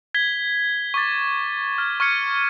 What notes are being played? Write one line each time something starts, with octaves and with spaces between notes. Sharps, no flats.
G#6 B6 G7
C#6 D6 A6
F6 G#6
C#6 F6 G#6 C#7 D#7